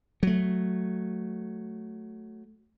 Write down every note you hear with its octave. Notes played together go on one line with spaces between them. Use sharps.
F#3 A3